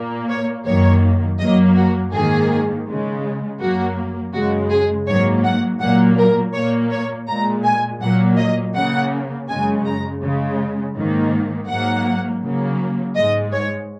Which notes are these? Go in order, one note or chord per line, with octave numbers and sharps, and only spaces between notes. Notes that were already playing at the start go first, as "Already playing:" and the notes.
Already playing: A#2 A#3
C#5
F#2 D#3 F#3 A#3 C#5
F#2 F#3 A#3 D#5
F#4
G#2 D#3 A#3 G#4
C#3 G#3
F#2 F#3 A#3 F#4
F#2 C#3 G#3 F#4
G#4
G#2 F#3 A#3 C#5
F#5
A#2 F#3 A#3 F#5
A#4
A#2 A#3 C#5
C#5
A#2 G#3 A#5
G#5
A#2 F#3 A#3 F#5
D#5
C#3 A#3 F#5
F#2 C#3 G#3 G#5
A#5
C#3 G#3
G#2 D#3 A#3
G#2 F#3 A#3 F#5
C#3 F#3 A#3
G#2 G#3 D#5
C#5